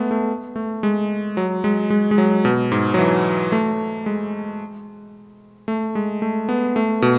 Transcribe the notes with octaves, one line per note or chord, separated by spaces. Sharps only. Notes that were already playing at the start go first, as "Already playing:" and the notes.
Already playing: G#3 A3 B3
A3
A3
G#3
F#3
G#3
G#3
G#3
F#3
B2
G#2
F#3
E3
A3
G#3
A3
G#3
A3
B3
A3
B2